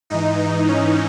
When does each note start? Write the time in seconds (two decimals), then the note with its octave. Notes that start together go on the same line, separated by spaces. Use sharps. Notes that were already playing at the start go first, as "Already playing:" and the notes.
0.10 G#2 E3 D#4
0.39 D#4
0.69 C#4